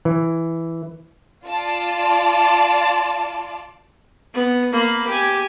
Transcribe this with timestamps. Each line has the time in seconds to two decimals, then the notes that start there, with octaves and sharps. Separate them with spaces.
0.05 E3
1.46 F4 D5 A5
4.34 B3
4.72 A#3 B5
5.07 G4 G#5